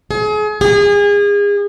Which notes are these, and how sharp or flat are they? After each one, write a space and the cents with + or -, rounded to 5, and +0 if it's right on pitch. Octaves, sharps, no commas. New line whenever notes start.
G#4 +35
G#4 -30